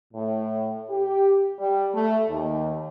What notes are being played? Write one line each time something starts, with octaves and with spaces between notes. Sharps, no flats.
A2
G4
G3
A3
D#2